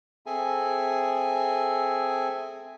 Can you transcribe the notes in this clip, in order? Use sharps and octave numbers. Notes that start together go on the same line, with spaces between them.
C4 G#4 A4 E5 G#5